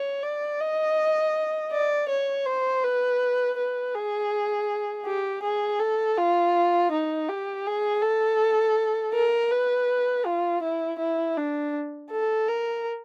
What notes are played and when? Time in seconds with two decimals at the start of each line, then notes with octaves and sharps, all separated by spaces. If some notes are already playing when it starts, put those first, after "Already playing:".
Already playing: C#5
0.23 D5
0.61 D#5
1.72 D5
2.09 C#5
2.46 C5
2.83 B4
3.57 B4
3.95 G#4
5.06 G4
5.43 G#4
5.80 A4
6.18 F4
6.92 D#4
7.29 G4
7.66 G#4
8.02 A4
9.14 A#4
9.52 B4
10.26 F4
10.63 E4
10.99 E4
11.37 D4
12.11 A4
12.49 A#4